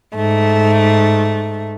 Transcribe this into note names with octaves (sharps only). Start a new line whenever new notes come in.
G#2 A3